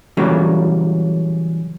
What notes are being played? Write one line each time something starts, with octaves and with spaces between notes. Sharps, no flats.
A#2 C#3 E3 F#3 G3 A#3